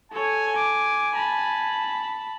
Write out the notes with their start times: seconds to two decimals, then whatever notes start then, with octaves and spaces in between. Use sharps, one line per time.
0.12 A4 C#5 G#5
0.56 D6
1.13 A5 B5